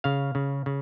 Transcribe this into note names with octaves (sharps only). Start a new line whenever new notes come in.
C#3 F5
C#3
C#3